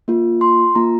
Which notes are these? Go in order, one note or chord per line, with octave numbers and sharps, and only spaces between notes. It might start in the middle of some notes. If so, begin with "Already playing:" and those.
A#3 F4
C6
A#3 F4 A#5